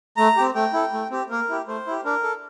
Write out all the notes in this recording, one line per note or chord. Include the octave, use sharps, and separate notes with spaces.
A3 A#5
C4 G4
A3 G5
E4 A4
A3
C4 G4
A#3 A#4
E4 G4
A3 C5
E4 G4
D4 A#4
A4